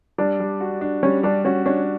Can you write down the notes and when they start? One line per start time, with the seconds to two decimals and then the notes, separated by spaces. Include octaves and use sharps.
0.18 G3 D4
0.40 G3
0.60 F#4
0.81 D4
1.03 G3 C#4
1.23 G3 D4
1.45 C#4 F#4
1.66 C#4 D4